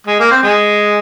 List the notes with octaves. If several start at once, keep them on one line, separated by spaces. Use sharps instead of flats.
G#3
A#3
C4
G#3